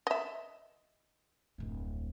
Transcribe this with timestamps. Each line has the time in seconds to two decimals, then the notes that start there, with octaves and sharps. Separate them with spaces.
0.07 D#5 E5
1.58 D1 F2